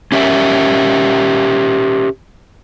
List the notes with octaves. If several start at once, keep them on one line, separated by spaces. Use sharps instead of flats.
C#4 G4 A#4 E5